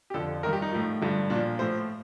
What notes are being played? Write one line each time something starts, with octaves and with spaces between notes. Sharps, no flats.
G4
F2 D3 F3 A4
G2 D#3 A#4
G4
D#4
A2 F3
G2 D3 F3
A#2 D4
F3
A2 F3 C5